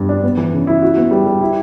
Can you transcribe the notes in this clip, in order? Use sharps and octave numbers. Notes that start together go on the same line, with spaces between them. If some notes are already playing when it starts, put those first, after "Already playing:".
Already playing: G2 B3
D4
B3
E3
C#3
E4
F#4
B3
G3
G3
E4